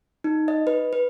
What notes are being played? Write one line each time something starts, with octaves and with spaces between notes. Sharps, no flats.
D#4
D#5
B4
B4